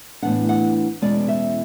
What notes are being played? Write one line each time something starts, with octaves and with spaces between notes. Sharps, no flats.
A2 E3 B3 D4 F#5
F#5
E2 B2 G#3 C#4 E4 D5
E5